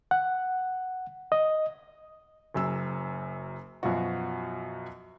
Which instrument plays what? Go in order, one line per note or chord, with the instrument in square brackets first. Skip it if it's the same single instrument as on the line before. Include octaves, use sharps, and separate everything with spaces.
[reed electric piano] F#5
D#5
[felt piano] F#1 F#2 E6
F#2 B2 F3 F4 F#4